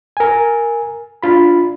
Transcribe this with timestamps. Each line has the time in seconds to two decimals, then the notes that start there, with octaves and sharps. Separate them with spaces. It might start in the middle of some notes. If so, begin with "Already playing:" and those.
0.17 A#4 G#5
1.23 D4 F4 B5